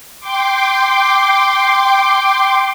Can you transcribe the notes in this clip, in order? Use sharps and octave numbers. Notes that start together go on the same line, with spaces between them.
G5 C6 D6